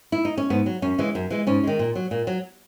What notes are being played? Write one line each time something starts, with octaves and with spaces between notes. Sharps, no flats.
E4
D#4
C#4
G#2 B3
F#3
F#2 C#4
C#3 E3 G#3
F#2
E3 G#3
G#2 C#4
D#3 G#3
A#2
F#3
A#2
F#3